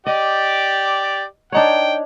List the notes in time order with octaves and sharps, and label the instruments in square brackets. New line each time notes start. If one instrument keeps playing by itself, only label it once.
[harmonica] G4 D5 [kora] D#5
[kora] D4 D#4 C#5 [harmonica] G5